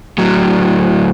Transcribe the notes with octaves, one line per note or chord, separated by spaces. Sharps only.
A2 F#3